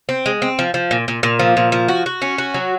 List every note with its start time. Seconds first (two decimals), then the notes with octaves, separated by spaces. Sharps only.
0.09 C4
0.26 G#3
0.42 C4
0.59 F3
0.74 F3
0.91 A#2
1.08 A#2
1.23 A#2
1.39 F3
1.57 A#2
1.72 F3
1.88 F#4
2.06 F#4
2.22 C#4
2.38 F#4
2.54 F#3